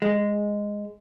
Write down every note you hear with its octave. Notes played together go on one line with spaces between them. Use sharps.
G#3